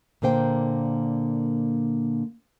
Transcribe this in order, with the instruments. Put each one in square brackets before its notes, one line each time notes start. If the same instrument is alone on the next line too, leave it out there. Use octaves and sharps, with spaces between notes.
[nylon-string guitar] A#2 D3 A#3 C5 G5